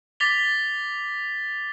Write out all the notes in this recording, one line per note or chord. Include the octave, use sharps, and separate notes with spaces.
D6 A6 B6 F7 G7